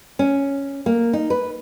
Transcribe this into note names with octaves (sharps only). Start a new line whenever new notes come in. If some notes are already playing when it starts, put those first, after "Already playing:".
C#4
A#3
D#4
B4